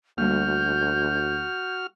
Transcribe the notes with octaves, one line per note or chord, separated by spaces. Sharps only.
D2 G3 A#3 F#4 F6 G6